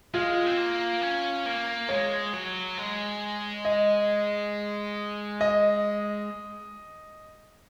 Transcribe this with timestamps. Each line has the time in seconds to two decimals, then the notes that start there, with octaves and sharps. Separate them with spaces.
0.14 G#3 F4
0.47 C4
0.57 A#3
1.02 C#4
1.46 A#3
1.89 G#3 C#5
2.33 F#3
2.78 G#3
3.65 D#5
5.41 D#5